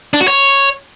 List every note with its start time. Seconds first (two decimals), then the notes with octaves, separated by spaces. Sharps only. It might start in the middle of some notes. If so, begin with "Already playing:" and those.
0.14 D4
0.21 F#4
0.28 C#5